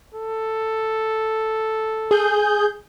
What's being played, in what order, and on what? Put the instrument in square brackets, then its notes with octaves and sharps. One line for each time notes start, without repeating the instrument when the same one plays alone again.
[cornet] A4
[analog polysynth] G#4 G6